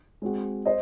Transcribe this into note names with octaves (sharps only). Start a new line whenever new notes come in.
G#3 C4 F#4
C5 D#5